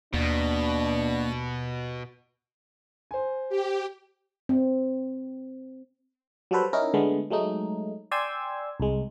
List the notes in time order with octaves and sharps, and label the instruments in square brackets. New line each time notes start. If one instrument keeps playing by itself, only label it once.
[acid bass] D#2 [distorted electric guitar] B2 [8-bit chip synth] A#3 [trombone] D4
[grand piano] C5 G#5
[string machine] G4
[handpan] C4
[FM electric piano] F#3 G3 F#4 A4 B4 C5
C#4 D#4 E4 A#4
D3 G#3 A3 B3
F#3 G#3 A3 D#4
D5 G5 G#5 C6 E6 G#6
C2 G#3